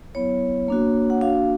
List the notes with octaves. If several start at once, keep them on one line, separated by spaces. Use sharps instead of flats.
F#3 B3 E4 C#5
A#3 D4 F#4
F#5
A#3 D4 F#4 F5